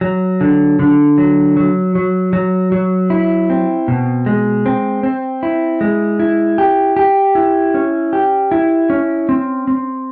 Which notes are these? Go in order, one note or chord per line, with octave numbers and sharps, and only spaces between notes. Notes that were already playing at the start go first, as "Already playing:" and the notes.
F#3
D3
D3
F#3
F#3
F#3
F#3
F#3
E4
C4
B2
G#3
C4
C4
E4
G#3
E4
G4
G4
E4
C#4
G4
E4
C#4
C4
C4